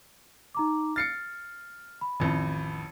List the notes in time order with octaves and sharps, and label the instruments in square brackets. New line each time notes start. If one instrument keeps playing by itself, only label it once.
[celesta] D#4 A#5 D6
[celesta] F6 [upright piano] A6 C7 C#7
[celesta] B5
[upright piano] A1 F2 [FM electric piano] D#3